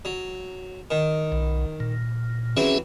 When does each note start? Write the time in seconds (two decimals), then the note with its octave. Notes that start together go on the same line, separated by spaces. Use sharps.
0.05 F#3
0.91 D#3
1.32 B1
1.80 A#2
2.57 E3 F#3 C4 C#4 G#4 E5